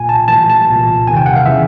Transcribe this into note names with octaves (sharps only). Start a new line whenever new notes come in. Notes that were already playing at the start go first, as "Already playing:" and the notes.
Already playing: B1 A#2 G#5
A5
A1 A2 E3 A5
A5
C2 A#2
E2 C3 D#3 G#5
G5
F#5
F5
C#3 E3 E5